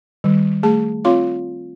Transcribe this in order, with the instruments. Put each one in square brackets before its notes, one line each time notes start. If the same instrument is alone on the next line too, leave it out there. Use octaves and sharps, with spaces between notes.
[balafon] D#3 G3
A3 G#4 A5
C4 F4 C#5 F5 C6 D6